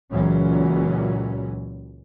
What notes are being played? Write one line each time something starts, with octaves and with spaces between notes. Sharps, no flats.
C#2 A#2 E3 F#3 C#4